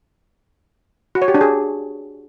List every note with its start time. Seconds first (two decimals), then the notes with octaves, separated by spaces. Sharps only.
1.15 F#4
1.22 C#5
1.28 G4
1.34 D4
1.41 G#4